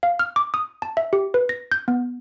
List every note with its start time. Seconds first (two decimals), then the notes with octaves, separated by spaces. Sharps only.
0.03 F5
0.19 F6
0.36 D6
0.54 D#6
0.82 A5
0.97 E5
1.13 G4
1.34 B4
1.49 A#6
1.72 G6
1.88 B3